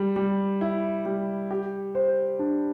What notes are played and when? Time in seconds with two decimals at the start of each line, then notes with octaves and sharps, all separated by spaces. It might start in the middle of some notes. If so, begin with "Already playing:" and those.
Already playing: G3
0.16 G3
0.61 E4
1.05 G3
1.51 G4
1.95 C5
2.39 D4